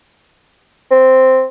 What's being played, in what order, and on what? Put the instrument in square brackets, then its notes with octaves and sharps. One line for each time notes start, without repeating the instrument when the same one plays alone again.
[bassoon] C4